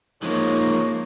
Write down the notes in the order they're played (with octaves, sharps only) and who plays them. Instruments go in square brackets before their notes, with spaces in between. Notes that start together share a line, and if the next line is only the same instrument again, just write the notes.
[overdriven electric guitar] F3 G#3 [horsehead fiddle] A#3 [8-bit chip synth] D#4 [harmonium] C#5